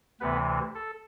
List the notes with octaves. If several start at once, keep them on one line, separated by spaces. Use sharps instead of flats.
D2 C3 E3 B3 B4
A4